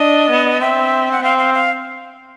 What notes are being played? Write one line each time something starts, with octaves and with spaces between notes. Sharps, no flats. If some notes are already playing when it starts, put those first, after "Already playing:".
Already playing: D4 D#5
B3
C4 E5
F#5
C4 F5
F5
F5